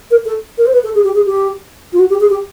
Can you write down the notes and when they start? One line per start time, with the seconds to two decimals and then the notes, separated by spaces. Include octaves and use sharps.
0.11 A#4
0.25 A4
0.58 A#4
0.66 C5
0.73 B4
0.83 A4
0.95 G#4
1.04 G4
1.15 G#4
1.26 G4
1.93 F4
1.99 F#4
2.09 G4
2.20 G#4
2.30 G4